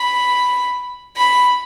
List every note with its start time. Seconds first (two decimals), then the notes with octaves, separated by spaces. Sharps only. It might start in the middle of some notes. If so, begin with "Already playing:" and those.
Already playing: B5
1.16 B5